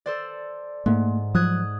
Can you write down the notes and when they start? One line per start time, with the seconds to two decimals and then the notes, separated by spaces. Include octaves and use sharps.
0.06 A4 C5 D5
0.86 G#2 A3 A#3
1.35 F3 F#3 D#6 F#6 G#6